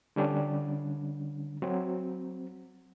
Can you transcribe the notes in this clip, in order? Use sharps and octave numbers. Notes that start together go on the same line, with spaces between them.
D3 G3 C#4 D4
F#3 C4